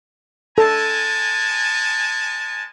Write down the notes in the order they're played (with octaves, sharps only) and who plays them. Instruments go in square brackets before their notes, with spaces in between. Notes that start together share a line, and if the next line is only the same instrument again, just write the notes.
[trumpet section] G#3 G#5 A5 [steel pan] A4